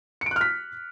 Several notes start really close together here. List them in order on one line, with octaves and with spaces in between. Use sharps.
C#7 D7 F#6 F6 B6